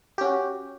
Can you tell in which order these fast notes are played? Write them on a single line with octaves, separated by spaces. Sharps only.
G4 C#4 F#4